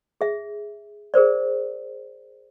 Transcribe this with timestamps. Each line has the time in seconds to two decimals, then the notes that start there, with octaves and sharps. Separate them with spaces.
0.21 G#4 E5
1.14 G#4 A#4 C5 D5